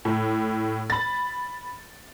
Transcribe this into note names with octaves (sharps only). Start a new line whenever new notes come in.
A2
B5 A6